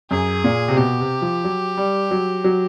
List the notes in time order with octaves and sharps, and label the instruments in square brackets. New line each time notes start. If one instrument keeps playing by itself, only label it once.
[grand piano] F#2 [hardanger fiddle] G#4
[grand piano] A#2
C3
[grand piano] B2 [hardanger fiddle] G4
[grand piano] C3
F3
F#3
G3
F#3
F#3